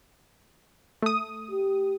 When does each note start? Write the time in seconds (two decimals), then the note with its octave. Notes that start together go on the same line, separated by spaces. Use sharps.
1.02 A3 D#6
1.51 G4